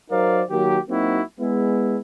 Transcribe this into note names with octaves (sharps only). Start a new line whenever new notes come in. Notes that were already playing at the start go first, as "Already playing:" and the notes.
F#3 D#4 A#4 C5 D5 F5
D#3 F#3 A#3 F#4 G4
F#3 A#3 C4 D#4 E4 F#4
G#3 B3 E4